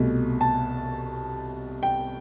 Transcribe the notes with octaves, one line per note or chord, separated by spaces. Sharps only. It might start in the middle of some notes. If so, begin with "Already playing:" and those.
Already playing: C2 B2 A3
A5
G5